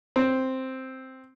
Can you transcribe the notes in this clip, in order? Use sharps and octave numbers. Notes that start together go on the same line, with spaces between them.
C4